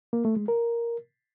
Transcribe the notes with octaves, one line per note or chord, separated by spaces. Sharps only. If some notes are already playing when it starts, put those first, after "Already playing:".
A#3
A3
G#3
A#4